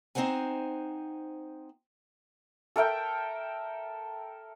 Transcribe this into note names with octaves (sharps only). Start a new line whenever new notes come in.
C4 D#4 C5 F#5 G#5
A4 A#4 E5 G5